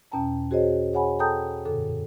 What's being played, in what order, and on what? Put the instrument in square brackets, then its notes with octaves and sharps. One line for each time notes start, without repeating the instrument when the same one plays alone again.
[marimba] E2 B2 C#4 G5 A5 A#5
F#4 G#4 C5 C#5 D#5
G#4 C#5 F#5 G#5 B5
A4 G5 A5 A#5 D#6 G6
F#2 A#2 D3 A4